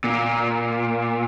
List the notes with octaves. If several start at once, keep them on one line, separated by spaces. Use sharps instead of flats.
A#2